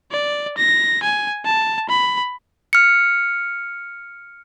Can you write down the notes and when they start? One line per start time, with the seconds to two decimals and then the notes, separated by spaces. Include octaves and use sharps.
0.11 D5
0.58 A#6
1.03 G#5
1.45 A5
1.89 B5
2.73 F6 C#7